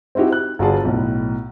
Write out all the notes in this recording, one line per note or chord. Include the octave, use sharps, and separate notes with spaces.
C4 D#4 E4 F#4 G4
F#6
G1 F4 F#4 G#4 D5 A5
B1 A2